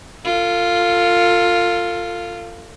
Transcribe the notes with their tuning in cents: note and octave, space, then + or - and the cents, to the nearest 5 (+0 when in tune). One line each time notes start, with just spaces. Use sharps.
F4 +0 A4 +40